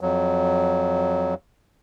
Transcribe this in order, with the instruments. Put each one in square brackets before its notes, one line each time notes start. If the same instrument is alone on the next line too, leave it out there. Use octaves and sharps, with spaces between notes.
[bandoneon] F2 F#3